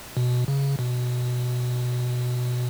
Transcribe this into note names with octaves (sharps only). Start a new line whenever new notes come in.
B2
C#3
B2